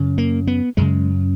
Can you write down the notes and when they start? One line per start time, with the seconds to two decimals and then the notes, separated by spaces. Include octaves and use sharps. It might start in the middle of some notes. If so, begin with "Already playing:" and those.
Already playing: F#2 C#3
0.18 A#3
0.47 B3
0.77 F#2 C#3 G#3